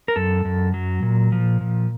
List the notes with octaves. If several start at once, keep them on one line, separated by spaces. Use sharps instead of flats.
A#4
F#2 A4
F#2
F#3
A#2
F3
A#2